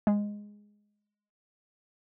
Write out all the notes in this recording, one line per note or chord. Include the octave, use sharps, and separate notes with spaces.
G#3